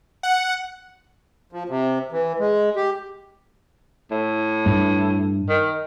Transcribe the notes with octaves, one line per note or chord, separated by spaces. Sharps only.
F#5
F3
C3
E3
G#3
G4
A2
G2
D#3